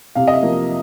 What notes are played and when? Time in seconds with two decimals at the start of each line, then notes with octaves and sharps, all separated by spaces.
0.15 C3 F5
0.27 D#5
0.33 E5
0.42 F3 A#3